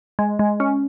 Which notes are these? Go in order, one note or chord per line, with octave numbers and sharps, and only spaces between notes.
G#3
G#3
C#4